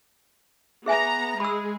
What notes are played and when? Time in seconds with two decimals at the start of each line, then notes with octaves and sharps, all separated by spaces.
0.86 B3 G#4 E5 G#5 A#5
1.40 G#3 G#4 B5 E6